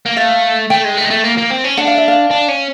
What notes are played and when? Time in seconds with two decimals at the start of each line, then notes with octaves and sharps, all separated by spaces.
0.06 A#3
0.17 A3 F5
0.70 A3 G5
0.84 G#3
0.97 A3
1.05 G#3
1.10 A3
1.24 A#3
1.37 A#3
1.50 C4
1.64 C#4
1.77 D4 F#5
1.87 F5
1.97 E5
2.08 F5
2.31 D4
2.48 C#4